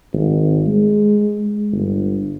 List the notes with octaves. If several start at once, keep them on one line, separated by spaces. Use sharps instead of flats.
G#1
G#3
G1